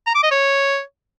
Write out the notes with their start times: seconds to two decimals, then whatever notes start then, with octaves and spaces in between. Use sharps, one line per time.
0.07 A#5
0.15 D6
0.23 D#5
0.31 C#5